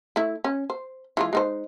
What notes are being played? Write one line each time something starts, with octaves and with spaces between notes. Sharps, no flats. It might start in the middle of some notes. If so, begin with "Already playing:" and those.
A3 E4
C#4
C5
E3 G#3 F4
G#3 D#4 C5